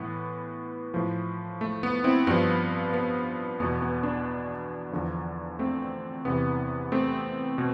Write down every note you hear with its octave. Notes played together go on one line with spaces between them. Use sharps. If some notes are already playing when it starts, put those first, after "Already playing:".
Already playing: A2 E3 B3
A2 F3
A3
B3
C4 E4
G2 F3 B3
B3
E2 B2 B3
B3
B3 D4
E2 D3 F3
A3 C4
E2 C3 E3 B3
A3 C4
B2